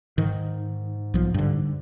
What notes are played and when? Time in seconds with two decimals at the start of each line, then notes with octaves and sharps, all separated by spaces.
0.18 G#2 D#3
1.14 B1 F3
1.34 G2 D3